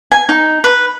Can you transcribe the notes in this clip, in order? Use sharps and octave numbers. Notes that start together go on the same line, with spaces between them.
G#5
D#4
B4